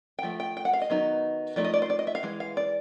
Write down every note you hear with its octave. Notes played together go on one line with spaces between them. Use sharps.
G5
F3 A3
G5
G5
F#5
F5
D#5
D#3 F#3 B3 D#4
F3 A3 D#4 D5
D#5
D5
C5
D5
D#5
E5
F5
E3 G#3
F5
D5